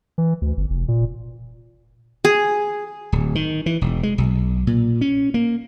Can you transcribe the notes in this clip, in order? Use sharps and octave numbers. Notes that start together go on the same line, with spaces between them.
E3
D2
G1
F1
A#2
G#4
D1
D#3
E3
E1
G#3
B1
A#2
C#4
A#3